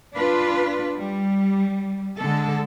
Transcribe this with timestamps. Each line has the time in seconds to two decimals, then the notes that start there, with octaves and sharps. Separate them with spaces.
0.15 D4 F4 B4
0.96 G3
2.18 D3 G#3 A4